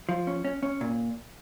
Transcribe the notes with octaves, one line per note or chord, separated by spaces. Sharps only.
F3
C#4
C#4
C#4
A#2